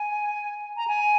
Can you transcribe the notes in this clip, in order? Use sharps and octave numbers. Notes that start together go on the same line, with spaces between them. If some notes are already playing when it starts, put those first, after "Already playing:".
Already playing: G#5
A#5
G#5